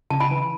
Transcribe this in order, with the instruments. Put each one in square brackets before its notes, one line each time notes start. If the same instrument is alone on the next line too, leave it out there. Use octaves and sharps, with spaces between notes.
[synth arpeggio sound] C#3 [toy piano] A5
[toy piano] G#5 B5
[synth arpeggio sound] E3